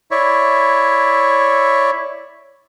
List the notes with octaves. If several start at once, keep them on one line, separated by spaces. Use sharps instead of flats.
E4 C#5 D5 E5